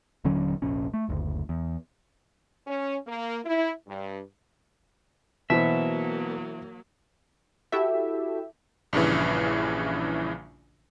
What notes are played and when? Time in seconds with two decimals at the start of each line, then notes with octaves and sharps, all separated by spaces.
0.24 D#1 D3 F#3 C#4
0.62 F1 A#1 C#4
0.94 A3
1.09 F#1 D2
1.49 E2
2.67 C#4
3.07 A#3
3.45 E4
3.87 G2
5.50 B2 E3 F#3 A#3 E4 C5 E5
7.72 E4 F#4 G4 A4 E5
8.93 A#1 G2 C#3 E3